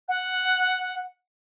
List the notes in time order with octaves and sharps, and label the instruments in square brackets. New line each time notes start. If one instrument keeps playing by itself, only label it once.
[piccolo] F#5